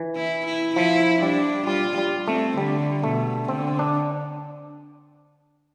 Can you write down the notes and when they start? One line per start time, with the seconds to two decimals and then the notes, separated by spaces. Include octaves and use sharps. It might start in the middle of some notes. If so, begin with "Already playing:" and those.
Already playing: E3
0.16 E4
0.46 E4
0.76 F3 E4
1.21 G3 D4
1.67 G3 F4
1.98 G3
2.27 A3 C4
2.58 D3 G3
3.04 B2 A3
3.48 D3 C4
3.79 D4